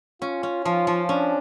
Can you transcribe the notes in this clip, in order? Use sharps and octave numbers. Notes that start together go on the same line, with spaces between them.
C#4 F4
C#4
F3 F4
F3
C#4 D4